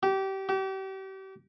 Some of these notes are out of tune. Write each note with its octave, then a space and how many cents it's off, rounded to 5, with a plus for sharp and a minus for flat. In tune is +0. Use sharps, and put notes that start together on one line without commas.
G4 -25
G4 -35